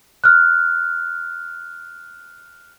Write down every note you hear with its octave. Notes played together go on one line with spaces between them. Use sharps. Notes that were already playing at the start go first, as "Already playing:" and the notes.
F6 F#6